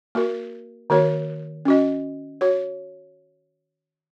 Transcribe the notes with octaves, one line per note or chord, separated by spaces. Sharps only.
A#3 F#4 A#4
D#3 A#3 F#4 A#4 C#5
C#4 F#4 D#5
F#4 C#5